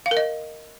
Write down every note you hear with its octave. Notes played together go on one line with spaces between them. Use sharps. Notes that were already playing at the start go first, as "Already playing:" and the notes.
F5
A#4
D#5